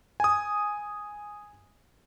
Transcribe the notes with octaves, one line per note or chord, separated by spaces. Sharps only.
G#5 D#6